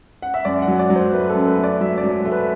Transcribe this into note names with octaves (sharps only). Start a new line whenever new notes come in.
F#5
E5
F#2 D5
F#5
F#3
D5
F#3
C5
A3 B4
A4
F#2
B4
A3
D5
F#3 E5
D5
F#3
A3
B4